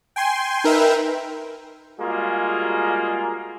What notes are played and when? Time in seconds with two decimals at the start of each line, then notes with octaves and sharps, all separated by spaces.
0.16 G5 G#5 C6
0.64 D#4 A#4 B4 E5 G5
1.99 G3 G#3 A#3 F4 F#4 G#4